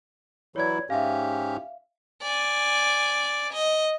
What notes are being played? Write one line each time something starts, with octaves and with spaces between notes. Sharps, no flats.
E3 F#3 E4 C#5 D5 G#6
G#2 C#4 G4 E5 F5
D5 G#5
D#5